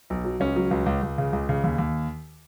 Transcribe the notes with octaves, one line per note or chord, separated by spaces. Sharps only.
B1
F#3
C#2 C#4
F#3
C#2
C#2
C#2
C#3
C#2
C#3
D#2
D#2